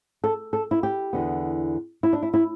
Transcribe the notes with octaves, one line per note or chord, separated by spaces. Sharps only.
A4
A4
E4
G4
E2 D3 B3
E4
D4
E4
E4